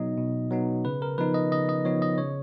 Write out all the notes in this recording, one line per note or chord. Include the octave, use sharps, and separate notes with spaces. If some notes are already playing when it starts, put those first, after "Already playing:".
Already playing: B2 F#3 B3 D#4 D#5
B2
F#3 B3 D#4
C#3 B4
A#4
F3 B3 D#4 B4
D#5
C#3 D#5
D#5
F3 B3 D#4 C#5
D#5
C#3 C#5